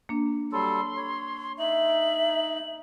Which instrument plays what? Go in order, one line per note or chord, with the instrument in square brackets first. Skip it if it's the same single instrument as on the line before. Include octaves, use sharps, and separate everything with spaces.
[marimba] A#3 D4
[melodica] F#3 G3 A4 [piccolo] C6
[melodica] C#5
[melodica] D#4 [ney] E5 [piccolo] F#7